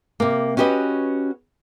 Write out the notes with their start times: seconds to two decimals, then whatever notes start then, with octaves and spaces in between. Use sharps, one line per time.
0.20 C3 A#3
0.57 C#4 F#4 G4 B4 D#5